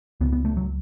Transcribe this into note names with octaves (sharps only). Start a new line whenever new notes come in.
C#2 C#3 B3
B3
A3
F#3